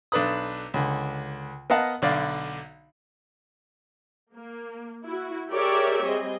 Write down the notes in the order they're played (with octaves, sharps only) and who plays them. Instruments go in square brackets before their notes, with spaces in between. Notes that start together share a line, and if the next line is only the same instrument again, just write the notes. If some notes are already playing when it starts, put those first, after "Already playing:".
[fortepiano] B1 D4 A4 B4 B5 D#6
C#2 D3
B3 A#4 D#5 F5 F#5 A5
B1 D3 D5 F5
[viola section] A#3
E4 F#4
G4 G#4 A#4 C#5 D5 E5
G3 C4 G#4 D#5